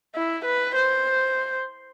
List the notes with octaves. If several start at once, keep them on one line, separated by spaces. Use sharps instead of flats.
E4
B4
C5